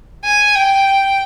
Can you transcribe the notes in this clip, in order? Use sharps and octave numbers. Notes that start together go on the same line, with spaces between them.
G#5
G5